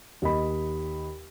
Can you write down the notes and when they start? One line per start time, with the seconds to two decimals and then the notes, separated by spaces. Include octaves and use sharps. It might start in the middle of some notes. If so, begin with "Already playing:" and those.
0.22 D#2 D#5 B5